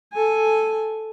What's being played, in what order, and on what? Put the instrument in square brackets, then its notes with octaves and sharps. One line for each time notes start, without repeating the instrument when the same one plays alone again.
[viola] A4 G#5